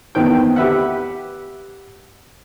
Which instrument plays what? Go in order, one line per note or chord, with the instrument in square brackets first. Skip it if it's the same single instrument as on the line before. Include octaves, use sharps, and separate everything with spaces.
[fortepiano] E2 D#3 B3 C4 G5
G4 B4 E5 F#5